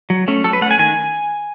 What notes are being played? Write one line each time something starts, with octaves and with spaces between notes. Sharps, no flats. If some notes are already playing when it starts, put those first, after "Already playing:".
F#3
A3 C#4
F#3 A4
B4
A3 C#4 F#5 G#5
D#3 G#5